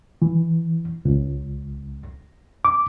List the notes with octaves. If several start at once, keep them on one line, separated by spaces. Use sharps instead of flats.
E3
C#2
D6